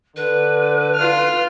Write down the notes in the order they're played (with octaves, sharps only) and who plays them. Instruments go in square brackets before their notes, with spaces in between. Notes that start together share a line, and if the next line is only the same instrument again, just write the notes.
[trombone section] D3 [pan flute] B4
[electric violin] F4 F6